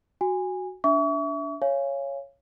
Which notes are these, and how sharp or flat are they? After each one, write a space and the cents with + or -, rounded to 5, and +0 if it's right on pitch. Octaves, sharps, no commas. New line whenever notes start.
F#4 +0 G#5 -20
D4 -25 E5 +0 C#6 +40
C#5 +0 F5 -25 G#5 +0